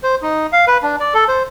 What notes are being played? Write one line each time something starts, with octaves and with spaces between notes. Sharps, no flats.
C5
D#4
F5
B4
D4
D5
A4
C5